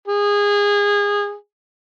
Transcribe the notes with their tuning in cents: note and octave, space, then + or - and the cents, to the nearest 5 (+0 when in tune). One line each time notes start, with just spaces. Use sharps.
G#4 -25